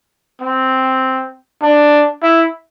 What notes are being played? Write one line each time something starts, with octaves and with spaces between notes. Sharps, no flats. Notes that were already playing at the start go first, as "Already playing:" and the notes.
C4
D4
E4